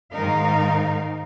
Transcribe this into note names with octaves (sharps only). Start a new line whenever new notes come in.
G#2 D#3 D#4 A#4 F5